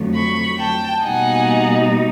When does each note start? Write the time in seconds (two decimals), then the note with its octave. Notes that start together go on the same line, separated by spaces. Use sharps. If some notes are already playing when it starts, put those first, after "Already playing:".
Already playing: F2 D3 F#3 A3
0.13 B5 C#6
0.58 G5 A5
1.02 B2 G3 A#3 D#4 F#5 G#5